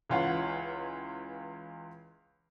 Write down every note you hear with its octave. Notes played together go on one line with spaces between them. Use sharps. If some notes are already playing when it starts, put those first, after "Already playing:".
C#2 E3 F4 C#5 F#5